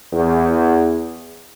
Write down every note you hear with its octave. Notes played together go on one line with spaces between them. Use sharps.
E2